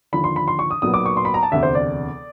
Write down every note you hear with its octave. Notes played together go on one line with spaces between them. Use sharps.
D#2 D3 F3 B5
C6
B5
C6
C#6
D#6
B1 A#2 F#3 B3 D#6
D6
C#6
C6
B5
A#5
A5
E1 D2 C3 E5
C5
D5